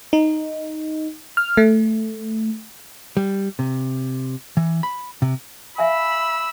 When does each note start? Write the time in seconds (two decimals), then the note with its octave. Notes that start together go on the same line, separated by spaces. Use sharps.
0.13 D#4
1.37 F6
1.57 A3
3.17 G3
3.59 C3
4.57 E3
4.83 B5
5.22 C3
5.78 E5 F5 G#5 B5 E6